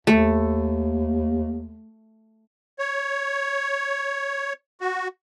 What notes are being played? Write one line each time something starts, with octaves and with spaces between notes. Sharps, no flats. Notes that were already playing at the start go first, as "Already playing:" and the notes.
D#2 A3
C#5
F#4